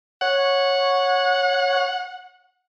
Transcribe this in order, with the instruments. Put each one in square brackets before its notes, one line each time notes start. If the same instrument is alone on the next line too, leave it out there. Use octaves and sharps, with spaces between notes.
[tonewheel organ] C#5 [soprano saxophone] F#5